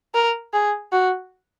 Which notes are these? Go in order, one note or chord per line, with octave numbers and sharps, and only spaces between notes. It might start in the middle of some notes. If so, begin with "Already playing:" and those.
A#4
G#4
F#4